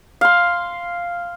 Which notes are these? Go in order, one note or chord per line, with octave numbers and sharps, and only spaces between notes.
F5 C6